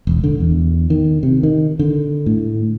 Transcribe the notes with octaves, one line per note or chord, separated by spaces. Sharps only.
E1
D3
E2
D#3
C3
D#3
D3
A2